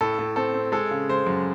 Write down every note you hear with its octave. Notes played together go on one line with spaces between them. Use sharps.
A2 A4
A2
C4 A4
C4
G#3 A4
C#3
G#3 C5
F#2